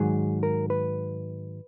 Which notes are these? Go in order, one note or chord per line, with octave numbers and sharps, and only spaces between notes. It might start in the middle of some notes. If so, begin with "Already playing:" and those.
Already playing: G#2 D#3 F#3 G#4
A#4
B4